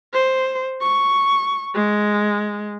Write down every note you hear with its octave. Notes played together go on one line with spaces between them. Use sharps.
C5
C#6
G#3